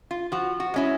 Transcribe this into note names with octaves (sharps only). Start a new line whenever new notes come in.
F4
F3 F#4
F#4
G#3 C#4 E4